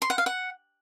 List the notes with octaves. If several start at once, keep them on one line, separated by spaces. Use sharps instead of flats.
C6
F#5
F5
F#5